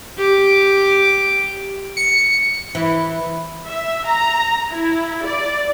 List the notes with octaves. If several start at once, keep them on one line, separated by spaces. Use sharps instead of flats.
G4 D6
C#7
E3
E5
A#5
E4
D5